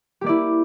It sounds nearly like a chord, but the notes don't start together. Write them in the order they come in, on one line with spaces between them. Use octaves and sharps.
G4 A#3 D5 E4